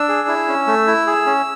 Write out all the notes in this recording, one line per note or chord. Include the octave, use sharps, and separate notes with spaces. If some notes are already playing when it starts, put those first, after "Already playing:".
Already playing: D4 E6
G#4
E4
C#4
A3
E4
G#4
C#4